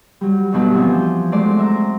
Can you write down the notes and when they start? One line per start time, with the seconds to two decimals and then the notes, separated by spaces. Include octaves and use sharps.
0.21 F#3 G3
0.52 D2 G2 B2 F#3
0.74 E3 F3 C4 E4
0.91 G6
1.32 F#3 G#3 A3 C5 D5
1.59 E5 A#5